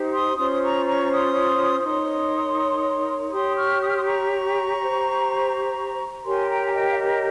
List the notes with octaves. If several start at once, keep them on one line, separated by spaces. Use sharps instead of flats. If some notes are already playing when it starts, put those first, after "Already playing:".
Already playing: D#4 G4 C5
C6 D#6
C#4 F4 C5 C6 D#6
D#6
A#5 C#6
A#5 C#6
C6 D#6
D#4 A#4 C#5 C6 D#6
G4 C#5 C6 D#6
C#6 F6
D#6
F6
C6 D#6
A#5 C#6
G4 C5
G4 A#4 C#5 G#5 C6
G5 A#5
G#5
D#5 G5
F5
D#5